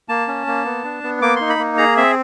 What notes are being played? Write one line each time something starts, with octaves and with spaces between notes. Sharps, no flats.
A#3 A5
C#4
A#3
B3
D4
B3
A#3 D6
D#4 C6
B5
A#3
G#4 A#5
C4 E5